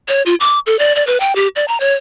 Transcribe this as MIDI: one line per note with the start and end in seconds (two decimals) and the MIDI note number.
0.08 0.22 73
0.26 0.35 65
0.40 0.59 86
0.66 0.78 69
0.79 0.95 74
0.95 1.05 74
1.07 1.18 71
1.20 1.35 79
1.35 1.48 67
1.56 1.65 74
1.68 1.80 82
1.80 1.94 73